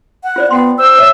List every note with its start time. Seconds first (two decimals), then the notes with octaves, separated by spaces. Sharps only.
0.24 F#5
0.36 F4 C5 D5
0.51 B3 F#5 G5 C6
0.78 C5 E6
0.99 C#5 D#5 E5